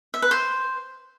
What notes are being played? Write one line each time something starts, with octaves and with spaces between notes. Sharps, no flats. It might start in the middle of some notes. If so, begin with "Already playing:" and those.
E5
B4
C5